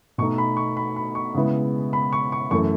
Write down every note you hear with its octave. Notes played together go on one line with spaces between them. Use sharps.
B2 A3 D#4 C#6
B5
C#6
B5
B5
C#6
C#3 G#3 B3 E4
B5
C#6
C#6
F#2 E3 A3 C#6